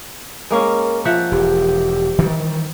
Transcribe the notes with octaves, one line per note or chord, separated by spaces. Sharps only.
G#3 A#3 C#4 A#4
F3 E5 F#5
E1 G4
D#3 E3 G3